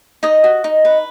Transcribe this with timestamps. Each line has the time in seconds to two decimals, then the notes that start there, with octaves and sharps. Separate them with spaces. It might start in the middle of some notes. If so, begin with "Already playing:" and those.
0.23 D#4 D#5
0.44 F#4
0.64 D#4
0.85 B4